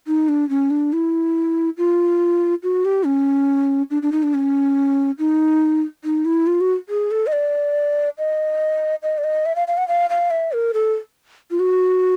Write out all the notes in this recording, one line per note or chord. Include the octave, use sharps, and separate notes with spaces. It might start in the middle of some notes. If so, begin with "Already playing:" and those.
D#4
D4
C#4
D4
E4
F4
F#4
G4
C#4
D4
D4
D#4
D4
C#4
D#4
D#4
E4
F4
F#4
G#4
A4
D#5
D5
D#5
D#5
D5
D#5
E5
F5
F5
F#5
F5
F5
E5
A#4
A4
F4
F#4